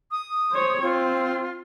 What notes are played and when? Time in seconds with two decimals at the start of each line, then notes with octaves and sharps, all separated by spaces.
0.11 D#6
0.52 C5 C#5
0.82 C4 F4